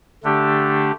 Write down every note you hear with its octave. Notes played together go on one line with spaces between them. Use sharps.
D3 A3 D4 G4